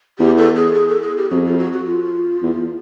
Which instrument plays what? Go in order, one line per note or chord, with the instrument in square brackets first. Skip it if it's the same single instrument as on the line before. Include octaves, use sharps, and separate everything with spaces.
[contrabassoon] E2 [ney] G4
[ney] A4
G#4
G#4
A4
G#4
G4
[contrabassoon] F2 [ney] F#4
[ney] F4
F#4
F#4
F4
[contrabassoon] E2